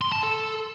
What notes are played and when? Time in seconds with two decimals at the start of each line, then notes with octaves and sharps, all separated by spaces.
0.01 C6
0.12 A5
0.23 A4